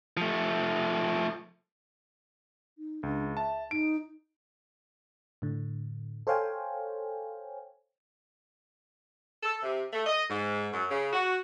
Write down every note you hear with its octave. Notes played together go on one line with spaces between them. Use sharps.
F3 A3
D#4
C#2 D4
E5 A5
D#4 D7
A2 D3
A4 C5 C#5 F5 G5 G#5
A4
C3
A3
D#5
G#2
F#2
C#3
F#4